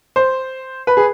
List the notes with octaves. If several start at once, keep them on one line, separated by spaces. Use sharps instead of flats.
C5
B4
G#4